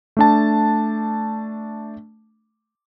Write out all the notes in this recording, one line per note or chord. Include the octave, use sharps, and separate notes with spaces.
A3 D4 A5